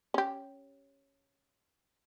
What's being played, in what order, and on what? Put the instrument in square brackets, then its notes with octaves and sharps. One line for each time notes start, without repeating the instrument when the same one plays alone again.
[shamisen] C#4 G4